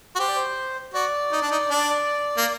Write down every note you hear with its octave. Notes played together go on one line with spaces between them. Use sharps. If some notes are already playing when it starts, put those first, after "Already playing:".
F#4
G4 C5
D5
C5
F#4 D5
D#4
D4
D#4
D4
A#3